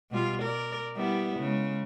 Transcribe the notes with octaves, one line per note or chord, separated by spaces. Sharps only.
B2 G3 F4
A#4 D5
G3 B3 E4
C#3 G#3